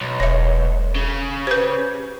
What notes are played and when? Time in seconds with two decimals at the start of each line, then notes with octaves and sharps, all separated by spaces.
0.01 B1
0.20 E1 C#5 E5
0.95 C#3
1.47 G4 B4 C5